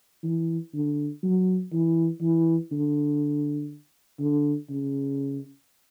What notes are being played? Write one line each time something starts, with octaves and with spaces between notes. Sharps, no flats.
E3
D3
F#3
E3
E3
D3
D3
C#3